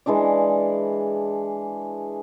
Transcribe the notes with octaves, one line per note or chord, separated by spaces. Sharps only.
E3 G#3 D4 D5